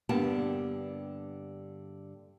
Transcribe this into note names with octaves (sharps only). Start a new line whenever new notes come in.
G2 D3 A#3 B3 G4 A5